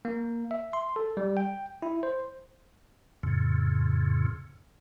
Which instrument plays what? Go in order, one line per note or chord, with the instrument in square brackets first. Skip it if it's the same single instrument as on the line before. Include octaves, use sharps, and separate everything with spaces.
[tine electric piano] A#3
E5
C6
A4
G3
G5
E4
C5
[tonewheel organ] F2 A2 C#3